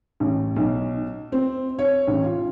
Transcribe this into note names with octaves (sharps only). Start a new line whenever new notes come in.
A1
B1
C4
C#5
A1
F4